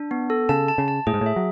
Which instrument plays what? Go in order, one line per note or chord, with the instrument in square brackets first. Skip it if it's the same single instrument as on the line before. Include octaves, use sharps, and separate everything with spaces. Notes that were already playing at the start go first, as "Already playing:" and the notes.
Already playing: [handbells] D4
B3
A4
[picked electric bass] C#3 [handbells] A5
[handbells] A5
[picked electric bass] C#3
[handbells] A5
[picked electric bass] A2 [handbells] G#4
[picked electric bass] G#2
A2
[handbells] E5
[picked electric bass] F#3